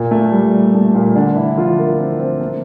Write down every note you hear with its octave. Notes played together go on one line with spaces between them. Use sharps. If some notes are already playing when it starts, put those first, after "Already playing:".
Already playing: A#2 A#3
A3
G3
A3
A#2 A#3
D3 D4
E3 E4
F3 F4
A#3 A#4
C4 C5
C4 C5
A#3 A#4